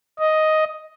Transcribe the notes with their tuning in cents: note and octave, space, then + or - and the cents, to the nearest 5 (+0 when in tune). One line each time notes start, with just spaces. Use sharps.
D#5 +5